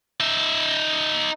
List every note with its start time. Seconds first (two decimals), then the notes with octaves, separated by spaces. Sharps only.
0.20 D#4 E5